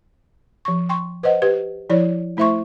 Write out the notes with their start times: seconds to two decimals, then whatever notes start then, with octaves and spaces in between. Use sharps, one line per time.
0.65 F3 C#6
0.89 G5 C6 C#6
1.23 B4 C5 D#5 F#5
1.42 G4 B4
1.90 F3 E4 C#5 D5
2.37 A3 E4 C5 E5 C6 C#6